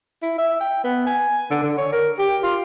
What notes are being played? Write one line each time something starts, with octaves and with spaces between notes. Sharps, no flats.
E4
E5
G5
B3
G#5
D3
D3
C#5
A#4
G4
F4